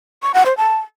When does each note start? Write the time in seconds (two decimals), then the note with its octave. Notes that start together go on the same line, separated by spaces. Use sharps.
0.23 C#6
0.34 F#5
0.46 C5
0.57 A5